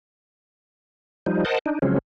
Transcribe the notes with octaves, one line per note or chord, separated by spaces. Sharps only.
F3 G3 D#4
A#4 C5 D#5 F#5 A5
D4 D#4
C#3 F3 F#3 G#3 C4 C#4